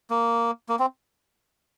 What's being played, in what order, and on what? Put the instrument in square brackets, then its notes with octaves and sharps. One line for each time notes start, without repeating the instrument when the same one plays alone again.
[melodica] A#3
A#3
C4